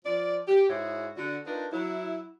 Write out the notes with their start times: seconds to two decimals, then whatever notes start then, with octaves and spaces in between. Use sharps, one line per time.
0.05 F3 D5
0.48 G4
0.69 G#2 E4 F#4 G#4 C#5
1.16 D3 F#4
1.46 D4 D#4 F4 A#4 B4
1.73 F#3 E4